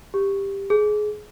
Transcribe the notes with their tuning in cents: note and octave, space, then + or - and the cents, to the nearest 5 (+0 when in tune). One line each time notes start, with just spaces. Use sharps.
G4 +10
G#4 +20